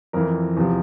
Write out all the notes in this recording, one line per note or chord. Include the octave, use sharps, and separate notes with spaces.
F2 E3 A#4
E2 C3 F3